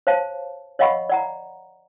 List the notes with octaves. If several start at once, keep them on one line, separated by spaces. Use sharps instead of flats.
C5 C#5 F5 A5
C#5 D#5 F5 F#5 B5 C#6
D5 F#5 A#5